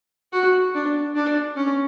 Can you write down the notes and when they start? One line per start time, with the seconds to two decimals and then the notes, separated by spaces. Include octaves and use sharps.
0.32 F#4
0.74 D4
1.16 D4
1.56 C#4